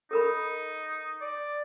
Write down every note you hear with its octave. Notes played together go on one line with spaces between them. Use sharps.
D#4 A4 A#4 B5
D5